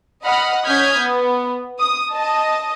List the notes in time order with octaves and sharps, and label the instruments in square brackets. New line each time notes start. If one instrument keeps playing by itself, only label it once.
[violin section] D#5 F#5 B5 F6
C#4 D#6 F6 G6 G#6 B6
B3
D#6
D#5 A5